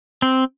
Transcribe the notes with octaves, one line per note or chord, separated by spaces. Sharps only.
C4